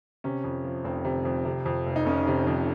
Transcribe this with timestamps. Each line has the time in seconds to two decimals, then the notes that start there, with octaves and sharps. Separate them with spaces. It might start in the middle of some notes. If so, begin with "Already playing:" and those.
0.24 C3 C#4
0.44 F2
0.64 F3
0.84 F1 C4
1.05 C3
1.25 F2
1.45 C3
1.66 F2
1.87 F1
1.96 D#4
2.06 F1 C#4
2.27 C3
2.47 F2